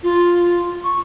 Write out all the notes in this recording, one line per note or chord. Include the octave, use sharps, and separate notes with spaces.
F4
C#6